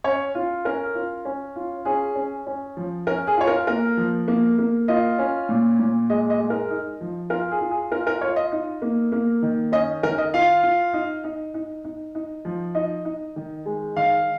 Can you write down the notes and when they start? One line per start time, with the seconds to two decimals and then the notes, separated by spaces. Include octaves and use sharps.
0.04 C#4 C#5
0.35 F4
0.65 C#4 A#4
0.95 F4
1.25 C#4
1.56 F4
1.85 C#4 G#4
2.16 C#4
2.47 C#4
2.77 F3
3.07 C#4 A#4
3.27 G#4
3.37 F4 C#5
3.47 A#4
3.67 A#3 A#4
3.97 F3
4.28 A#3
4.58 A#3
4.88 F4 D#5
5.19 C#4
5.49 A#2
5.79 A#2
6.10 G#3 D#5
6.30 D#5
6.40 G#3
6.50 A#4
6.70 D#4
7.01 F3
7.30 F4 A#4
7.51 G#4
7.61 F4
7.71 G#4
7.91 F4 A#4
8.07 A#4
8.21 F4 C#5
8.36 D#5
8.52 D#4
8.82 A#3
9.12 A#3
9.42 D#3
9.72 C#4 D#5
10.03 D#3 A#4
10.18 D#5
10.33 F4 F5
10.63 F4
10.93 D#4
11.24 D#4
11.54 D#4
11.84 D#4
12.15 D#4
12.45 F3
12.75 D#4 D#5
13.05 D#4
13.36 D#3
13.66 G#3
13.96 D#3 F5